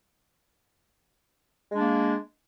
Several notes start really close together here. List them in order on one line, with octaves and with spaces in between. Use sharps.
G#3 D4 A#3